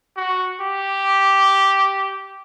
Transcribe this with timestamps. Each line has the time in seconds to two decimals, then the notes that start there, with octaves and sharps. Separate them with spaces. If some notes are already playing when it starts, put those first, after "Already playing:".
0.17 F#4
0.60 G4